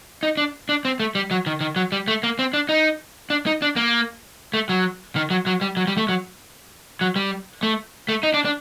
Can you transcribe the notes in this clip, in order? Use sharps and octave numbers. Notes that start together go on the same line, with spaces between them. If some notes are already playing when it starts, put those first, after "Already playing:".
D#4
D4
D4
C4
A3
G3
F#3
D#3
D#3
F#3
G3
A3
A#3
C4
D4
D#4
D4
D#4
D4
A#3
A3
F#3
D#3
F#3
F#3
G3
F#3
G3
A3
F#3
F#3
G3
A3
A3
D#4
D4
D4